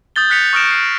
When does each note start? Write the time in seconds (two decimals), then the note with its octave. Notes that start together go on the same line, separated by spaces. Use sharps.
0.16 D#6 G6 A6 G7
0.30 F#6 B6 C#7 F7
0.53 C#6 D#6 F6 A#6 D7 E7
0.71 C7 D7